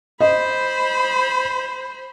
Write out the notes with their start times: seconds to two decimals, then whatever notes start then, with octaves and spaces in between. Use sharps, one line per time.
0.21 C5 D#5 B5